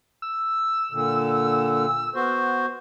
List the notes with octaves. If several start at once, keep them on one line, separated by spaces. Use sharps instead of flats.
E6
A#2 D3
B3 F#4 C5